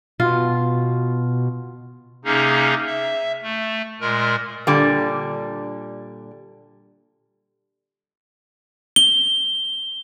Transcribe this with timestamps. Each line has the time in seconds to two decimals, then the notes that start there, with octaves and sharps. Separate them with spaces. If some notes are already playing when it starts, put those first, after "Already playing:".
0.20 B2 F4
2.25 C3 A#3 C#4 D#4 G#4
2.86 E5
3.42 A3
4.01 A#2 G#3 A#4
4.67 A#2 D3 G3
8.96 G7